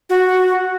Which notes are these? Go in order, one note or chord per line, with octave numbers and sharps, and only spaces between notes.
F#4